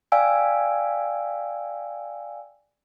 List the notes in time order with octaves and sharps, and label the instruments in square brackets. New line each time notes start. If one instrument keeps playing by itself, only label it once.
[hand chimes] D5 F5 G5 G#5 E6 D7